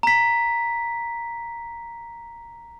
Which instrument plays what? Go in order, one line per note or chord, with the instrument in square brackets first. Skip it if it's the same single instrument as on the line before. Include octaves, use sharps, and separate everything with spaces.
[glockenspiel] A#5 B6